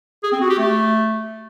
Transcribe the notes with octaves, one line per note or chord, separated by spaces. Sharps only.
G#4
C4
F#4
G4
A3